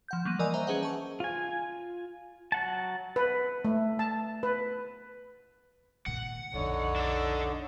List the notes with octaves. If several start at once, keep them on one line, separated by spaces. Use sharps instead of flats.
F3 F#5 G6
F#3 G3 A#3 D#7
E3 A#4 D5 D#5 G#5 D#6
C5 D#5 E5 G#5 A#5
C#4 G#4 B4 C5 F#5
A5 C#6
F4 G#5
F#3 F#5 A5
B4
A3
A5
B4
A#2 D#3 F#5
B1 F2 D3 D#4 C#5
D4 A4